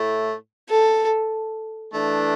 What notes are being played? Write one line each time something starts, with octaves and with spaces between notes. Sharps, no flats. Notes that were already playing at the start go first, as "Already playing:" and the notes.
Already playing: A2 A3 E4
A4
E3 A3 D4